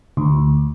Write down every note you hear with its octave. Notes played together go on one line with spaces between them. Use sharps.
D2